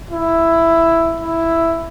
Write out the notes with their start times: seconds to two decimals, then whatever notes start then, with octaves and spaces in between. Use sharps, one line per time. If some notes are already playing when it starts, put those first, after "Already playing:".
0.11 E4
1.20 E4